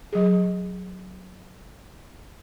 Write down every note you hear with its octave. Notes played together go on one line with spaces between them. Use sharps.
F#3 G#4